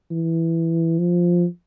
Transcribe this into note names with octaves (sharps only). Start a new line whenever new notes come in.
E3
F3